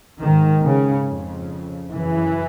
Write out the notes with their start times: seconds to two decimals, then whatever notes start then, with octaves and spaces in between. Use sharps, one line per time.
0.21 G#2 D#3
0.63 C#3
1.06 F2 C#3
1.91 F#2 C#3 E3